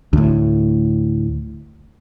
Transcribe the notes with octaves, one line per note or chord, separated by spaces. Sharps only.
D2 A2